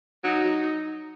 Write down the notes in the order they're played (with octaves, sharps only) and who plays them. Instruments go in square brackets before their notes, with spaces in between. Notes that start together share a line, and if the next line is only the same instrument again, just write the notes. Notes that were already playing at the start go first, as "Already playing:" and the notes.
[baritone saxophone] F#3 [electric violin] D#4
[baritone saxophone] F#3